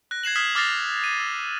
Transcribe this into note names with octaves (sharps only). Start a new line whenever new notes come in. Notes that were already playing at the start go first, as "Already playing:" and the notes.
F#6 A#6
G#6 C7 E7 F#7
D#6 F6 G#6 B6 C7 E7
D6 F6 A6 A#6 C7 F7
D#7
E6